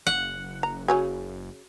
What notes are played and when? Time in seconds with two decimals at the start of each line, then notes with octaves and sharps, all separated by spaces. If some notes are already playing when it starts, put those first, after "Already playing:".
0.07 F#1 F#5
0.63 A#5
0.88 C#3 C#4 F#4 G#5